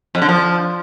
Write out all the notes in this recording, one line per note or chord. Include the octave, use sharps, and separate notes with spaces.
F2
D3
F3